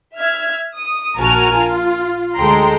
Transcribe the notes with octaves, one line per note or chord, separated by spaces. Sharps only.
E5 F6 G#6
D#6
A#1 F#4 A#4 G#5 A5 F6
F4
D2 G#3 A4 G5 A#5 C6